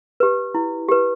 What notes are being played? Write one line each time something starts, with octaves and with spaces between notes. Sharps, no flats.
G4 B4
E4
G4 B4